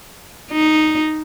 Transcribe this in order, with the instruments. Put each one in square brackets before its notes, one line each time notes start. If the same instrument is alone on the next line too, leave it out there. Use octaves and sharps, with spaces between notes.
[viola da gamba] D#4